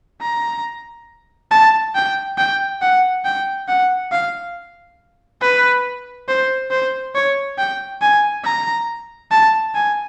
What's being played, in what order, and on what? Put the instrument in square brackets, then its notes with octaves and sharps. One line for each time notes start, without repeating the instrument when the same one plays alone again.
[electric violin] A#5
A5
G5
G5
F#5
G5
F#5
F5
B4
C5
C5
C#5
G5
G#5
A#5
A5
G#5